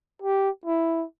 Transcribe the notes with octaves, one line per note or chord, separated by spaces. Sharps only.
G4
E4